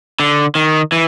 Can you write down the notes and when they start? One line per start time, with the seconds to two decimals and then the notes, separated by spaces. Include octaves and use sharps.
0.20 D3
0.55 D#3
0.92 E3